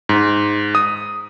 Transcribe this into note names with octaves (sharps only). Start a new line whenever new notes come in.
G#2
D#6